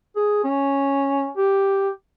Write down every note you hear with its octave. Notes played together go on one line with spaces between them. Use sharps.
G#4
C#4
G4